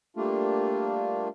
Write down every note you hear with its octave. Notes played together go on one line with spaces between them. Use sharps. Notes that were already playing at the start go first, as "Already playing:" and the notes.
G3 A3 A#3 D4 F4